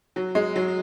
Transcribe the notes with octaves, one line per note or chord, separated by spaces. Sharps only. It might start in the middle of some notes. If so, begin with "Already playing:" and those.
F#3
G#3
F#3